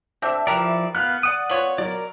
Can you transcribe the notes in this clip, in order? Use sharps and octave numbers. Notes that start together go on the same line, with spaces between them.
C4 D4 A4 E5
F3 E4 G4 A#4 B4 D5
B3 F5 F#6
D5 F#5 D#6
B3 F4 C#5 F#7
F#3 A#4 D5